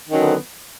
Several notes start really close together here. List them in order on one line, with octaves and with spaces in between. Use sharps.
D#3 C#4 F#3 D3 B3